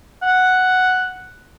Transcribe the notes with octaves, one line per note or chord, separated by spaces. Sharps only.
F#5